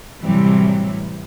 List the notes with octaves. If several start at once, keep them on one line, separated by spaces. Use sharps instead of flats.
A2 C3 E3 F#3 G3